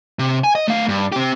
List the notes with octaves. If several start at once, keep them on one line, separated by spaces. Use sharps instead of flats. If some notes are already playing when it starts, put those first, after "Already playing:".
C3
G#5
D#5
A3 F5
G2
C4 G4